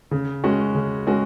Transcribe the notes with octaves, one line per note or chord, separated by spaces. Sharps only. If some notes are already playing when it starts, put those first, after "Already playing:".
C#3
G#3 C#4 F#4
C#3
G#3 C#4 F#4